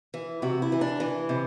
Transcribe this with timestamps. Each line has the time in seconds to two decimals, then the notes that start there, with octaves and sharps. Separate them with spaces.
0.14 E3
0.42 C3 F#4
0.62 E4
0.72 E3
0.81 D4
1.00 E3
1.29 C3